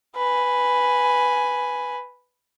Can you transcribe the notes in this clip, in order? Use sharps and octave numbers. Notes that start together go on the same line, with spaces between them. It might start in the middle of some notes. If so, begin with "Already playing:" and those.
B4 G#5